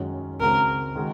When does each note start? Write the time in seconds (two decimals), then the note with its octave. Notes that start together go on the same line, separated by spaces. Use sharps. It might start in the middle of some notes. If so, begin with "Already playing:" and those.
Already playing: F#2 D#3 G#3 C#4 F#4
0.40 C#2 C#3 G#3 C4 F#4 A#4
0.95 D#3 G#3 D#4 F#4